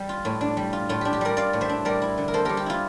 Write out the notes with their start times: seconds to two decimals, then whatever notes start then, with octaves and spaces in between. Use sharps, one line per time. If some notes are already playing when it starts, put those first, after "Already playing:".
Already playing: G3
0.09 F4
0.25 A2
0.41 D4
0.57 G3
0.73 F4
0.89 A2 F4
1.01 D4 G4
1.13 G4
1.21 G3 A#4 D5
1.37 F4 D5 F5
1.53 A2
1.61 C5 E5
1.69 D4
1.85 G3 A#4 D5
2.02 E4
2.18 D3
2.28 A#4
2.33 A#3 A4 C5
2.45 G3 G4 A#4
2.57 G4
2.66 E4 F4